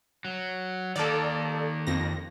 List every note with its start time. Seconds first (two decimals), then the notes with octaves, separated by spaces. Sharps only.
0.25 F#3
0.96 D#3 A#3 A4 D5
1.87 F2 A#6